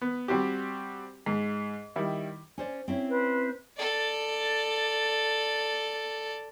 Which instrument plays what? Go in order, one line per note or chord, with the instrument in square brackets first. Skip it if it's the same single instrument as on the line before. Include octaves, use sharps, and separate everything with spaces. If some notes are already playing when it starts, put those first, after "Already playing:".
[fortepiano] B3
G3 C4 F#4 G4
G#2
D#3 G3 E4
[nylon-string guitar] C#4 C5 D5
C4 C#4 E4
[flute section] B4 C5
[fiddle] A4 D5